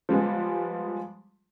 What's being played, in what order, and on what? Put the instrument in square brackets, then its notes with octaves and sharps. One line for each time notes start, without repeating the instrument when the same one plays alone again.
[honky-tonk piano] F3 G3 G#3 B3